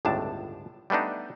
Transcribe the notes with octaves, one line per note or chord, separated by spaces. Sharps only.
G1 C#2 A2 D4 A5
G3 A3 B3 D4 D#4